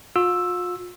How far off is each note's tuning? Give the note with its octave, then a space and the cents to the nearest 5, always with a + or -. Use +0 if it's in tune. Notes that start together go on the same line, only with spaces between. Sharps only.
F4 +40 E6 +0